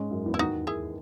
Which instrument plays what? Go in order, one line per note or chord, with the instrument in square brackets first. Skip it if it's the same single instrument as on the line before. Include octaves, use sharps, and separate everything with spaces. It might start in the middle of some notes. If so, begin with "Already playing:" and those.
Already playing: [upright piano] G#2 G#3 [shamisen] C#4
[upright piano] F#2 F#3
E2 E3
[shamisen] E4
[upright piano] D#2 D#3 [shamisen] D#4 F#4
[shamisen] E4 G#4